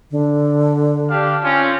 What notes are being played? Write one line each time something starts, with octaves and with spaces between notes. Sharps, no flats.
D3
D4 G4 F5
C4 C#4 F4